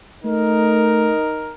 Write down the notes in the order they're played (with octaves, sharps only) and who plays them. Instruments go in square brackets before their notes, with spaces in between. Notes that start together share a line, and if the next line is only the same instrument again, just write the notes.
[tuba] A3 [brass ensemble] D#4 A#4